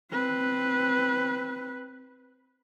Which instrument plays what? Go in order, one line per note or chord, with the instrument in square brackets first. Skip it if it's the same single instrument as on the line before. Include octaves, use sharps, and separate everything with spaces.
[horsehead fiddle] C4 B4